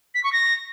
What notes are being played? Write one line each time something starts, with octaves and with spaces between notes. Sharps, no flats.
B6
C#6
A#6